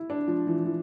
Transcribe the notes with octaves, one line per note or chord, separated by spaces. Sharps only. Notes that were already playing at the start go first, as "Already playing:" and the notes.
Already playing: E4
D4
F3
E3
E3